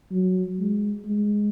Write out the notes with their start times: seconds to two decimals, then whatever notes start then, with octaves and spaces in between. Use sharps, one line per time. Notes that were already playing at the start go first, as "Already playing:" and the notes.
0.11 F#3
0.60 G#3
1.06 G#3